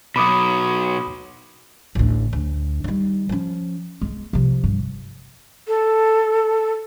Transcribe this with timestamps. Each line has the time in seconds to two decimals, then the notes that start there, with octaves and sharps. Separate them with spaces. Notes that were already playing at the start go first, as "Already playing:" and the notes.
0.16 B2 F#3 B5 D6 D#6
1.95 A1 D2
2.33 D2
2.84 D#3 G3
3.29 F3 C#4
4.01 G#3 B3
4.33 C3 F3
4.64 G2
5.68 A4